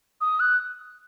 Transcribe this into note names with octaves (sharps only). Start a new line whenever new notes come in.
D#6
F#6